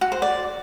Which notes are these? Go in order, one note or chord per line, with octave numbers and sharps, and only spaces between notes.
F#4
C5
D5